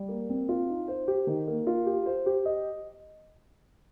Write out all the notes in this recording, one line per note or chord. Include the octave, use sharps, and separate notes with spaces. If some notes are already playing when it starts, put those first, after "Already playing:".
Already playing: G3
A#3
C4
F4
D#4
C5
G4
D#3
A#3
F4
G4
C5
G4
D#5